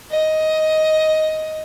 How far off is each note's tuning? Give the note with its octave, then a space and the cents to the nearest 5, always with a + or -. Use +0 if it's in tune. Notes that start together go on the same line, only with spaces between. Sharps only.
D#5 +10